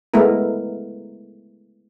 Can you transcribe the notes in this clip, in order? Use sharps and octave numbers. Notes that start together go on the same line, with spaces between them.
G#3 A3 B3 E4 A#4